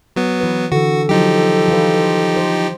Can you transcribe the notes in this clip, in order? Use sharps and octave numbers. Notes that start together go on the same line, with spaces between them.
F#3 B3
E3 B4
D3 E3 F#4 A4
F3 F#3 D#4 G4
E3 F4 B4
C5